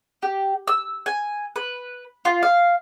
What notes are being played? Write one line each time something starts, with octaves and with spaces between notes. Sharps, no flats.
G4
E6
G#5
B4
F4
F5